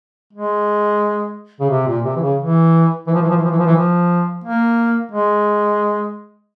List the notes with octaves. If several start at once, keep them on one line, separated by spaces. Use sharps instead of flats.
G#3
C#3
C3
A#2
C3
E3
C#3
E3
E3
F3
E3
F3
E3
F3
E3
F3
E3
F3
A#3
G#3